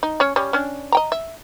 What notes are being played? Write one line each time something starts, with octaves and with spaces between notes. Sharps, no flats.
D#4
C#4 C#5
G3 C#4
C#4 D4
D#5 G5 A#5
E5